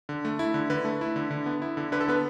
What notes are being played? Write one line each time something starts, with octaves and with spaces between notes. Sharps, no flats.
D3
A3
E4
D3
D3 B4
A3
E4
D3
D3
B3
E4
D3
D3 B4
A4
B3 B4